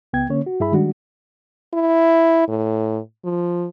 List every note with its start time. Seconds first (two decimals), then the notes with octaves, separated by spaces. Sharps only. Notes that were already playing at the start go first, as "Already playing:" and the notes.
0.13 C#2 B3 G5 G#6
0.29 D3 A#3 C#4 C#5
0.46 F#4
0.60 G2 E4 G#4 E5 B5
0.72 D#3 G3 G#3 D4 F#4
1.74 E4
2.49 A2
3.24 F3